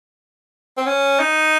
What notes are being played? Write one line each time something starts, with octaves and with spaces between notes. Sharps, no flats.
C4
C#4
D#4